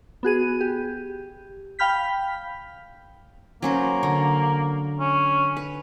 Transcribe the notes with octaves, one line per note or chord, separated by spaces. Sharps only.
B3 F#4 G#4 D#7
G4
F5 G5 B5 F6 G6 B6
F#3 A#3 C#4 C5
D3
C#4
B4